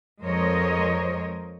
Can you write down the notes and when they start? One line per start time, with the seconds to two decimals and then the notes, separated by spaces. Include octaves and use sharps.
0.22 F2 G#3 A#4 C5 C#5 D#5